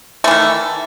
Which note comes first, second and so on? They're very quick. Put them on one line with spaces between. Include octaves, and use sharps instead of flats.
A3 E3 D#3